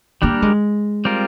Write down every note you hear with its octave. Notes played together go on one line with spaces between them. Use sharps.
G3 A#3 D4 G4 A#4
G#3
G3 C4 F4 A#4